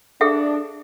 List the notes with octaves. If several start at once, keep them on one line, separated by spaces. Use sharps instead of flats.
D4 G#4 A4 E5